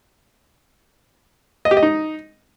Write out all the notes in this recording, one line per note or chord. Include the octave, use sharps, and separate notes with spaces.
D#5
G4
D#5
D#4